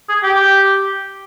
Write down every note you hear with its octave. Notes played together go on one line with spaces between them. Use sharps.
G#4
G4